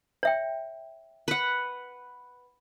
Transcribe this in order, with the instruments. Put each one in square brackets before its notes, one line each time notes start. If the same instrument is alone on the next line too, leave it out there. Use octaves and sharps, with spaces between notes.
[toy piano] C#5 E5 G5
[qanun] B4 F#5